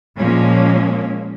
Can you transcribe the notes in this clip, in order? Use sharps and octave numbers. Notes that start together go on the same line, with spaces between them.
A#2 F3 G#3 A#3 C#4